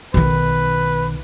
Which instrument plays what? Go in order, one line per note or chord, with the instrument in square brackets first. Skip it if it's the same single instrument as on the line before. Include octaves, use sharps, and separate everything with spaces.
[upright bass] B1 D#3 [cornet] B4